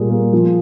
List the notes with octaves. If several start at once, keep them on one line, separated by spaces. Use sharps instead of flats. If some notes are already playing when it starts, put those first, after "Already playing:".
Already playing: A#2 G3 A#3 G#4
A#3
F3